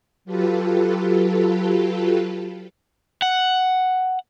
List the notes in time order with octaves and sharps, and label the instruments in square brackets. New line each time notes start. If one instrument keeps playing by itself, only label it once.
[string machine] F#3 F4 G4 A4 B4
[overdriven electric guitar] F#5